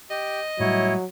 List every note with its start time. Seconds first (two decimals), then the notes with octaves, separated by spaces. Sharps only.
0.10 G4 D#5
0.60 A2 F#3 G3 E4 C#5